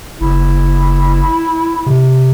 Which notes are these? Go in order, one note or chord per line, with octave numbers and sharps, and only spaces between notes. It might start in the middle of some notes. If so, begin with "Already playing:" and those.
F#1 E4
C3